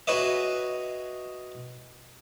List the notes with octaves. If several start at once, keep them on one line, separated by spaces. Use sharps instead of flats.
F#4 G#4 B4 C#5 D#5 E5